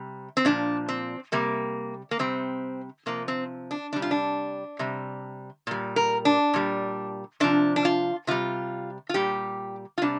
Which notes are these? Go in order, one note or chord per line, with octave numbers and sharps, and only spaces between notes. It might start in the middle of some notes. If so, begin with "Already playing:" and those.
Already playing: C3 G3
C4
A#2 F3 D4
C4
C3 G3 A#3
A#3
C3 G3 C4
C3 F3 A#3
C4
D4
C3 G3 D4
F4
D4
C3 G3
A#2 G3
A#4
D4
A#2 G3
C3 F3 D4
D4
F4
C3 G3 F4
F4
A#2 G3 G4
F4
C3 G3 D4